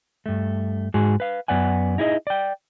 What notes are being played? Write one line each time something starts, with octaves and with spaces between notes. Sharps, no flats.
G2 A3
G#2 G#3 F#4 G#4
B4 F5
F#2 B3 D5 F#5 G#5
D#4 E4 G#4 A4 D#5
D5 G5